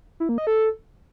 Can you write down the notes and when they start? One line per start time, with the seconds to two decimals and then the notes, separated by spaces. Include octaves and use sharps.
0.20 E4
0.29 A#3
0.38 D#5
0.47 A4